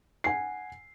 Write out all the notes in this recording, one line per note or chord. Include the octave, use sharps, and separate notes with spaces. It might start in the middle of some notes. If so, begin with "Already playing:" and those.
F#5 G#5 C7